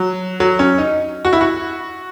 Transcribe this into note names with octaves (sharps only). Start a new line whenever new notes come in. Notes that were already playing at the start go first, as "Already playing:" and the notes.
Already playing: F#3
F#3
C#4
D#4
F#4
E4
F#4